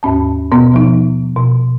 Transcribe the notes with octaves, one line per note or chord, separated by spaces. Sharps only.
D#2 G#2 C#4 A5
B2 B3
B2 F3 D#4
B2